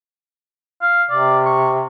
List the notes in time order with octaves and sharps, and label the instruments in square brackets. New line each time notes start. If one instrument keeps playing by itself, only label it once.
[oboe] F5
[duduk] C3 [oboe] D5
[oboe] C#6